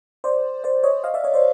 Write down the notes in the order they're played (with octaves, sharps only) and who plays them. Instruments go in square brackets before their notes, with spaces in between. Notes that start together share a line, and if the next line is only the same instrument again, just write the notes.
[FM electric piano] C5 D5
C5 D5
C#5 D#5
D#5 F5
D5 E5
C#5 D#5
C5 D5